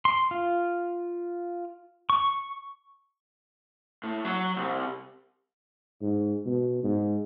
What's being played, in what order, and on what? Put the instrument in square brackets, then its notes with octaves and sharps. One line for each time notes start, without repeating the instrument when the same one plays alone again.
[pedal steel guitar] C6
F4
C#6
[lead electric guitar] A2
F#3
C2
[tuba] G#2
B2
G#2